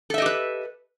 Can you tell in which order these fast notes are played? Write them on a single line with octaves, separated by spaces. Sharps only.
A4 E5 D#5 G4 B4